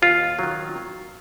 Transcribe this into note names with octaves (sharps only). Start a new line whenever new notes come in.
D#2 F4
D#3 F#3